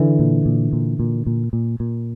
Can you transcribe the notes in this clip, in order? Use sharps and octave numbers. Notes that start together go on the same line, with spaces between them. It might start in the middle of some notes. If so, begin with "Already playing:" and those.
Already playing: D3 E3
A#2
A#2
A#2
A#2
A#2
A#2
A#2